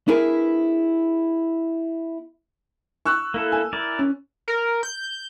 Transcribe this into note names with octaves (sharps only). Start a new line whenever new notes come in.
B3 D4 E4 G#4 A#4 B4
C#6 E6 F#6
A#3 E4 A4
G#5
E4 A#4 D5
C#4
A#4
G6